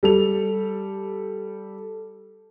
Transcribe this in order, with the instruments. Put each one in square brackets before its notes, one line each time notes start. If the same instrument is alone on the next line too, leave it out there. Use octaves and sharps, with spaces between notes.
[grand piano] G3 A4 F7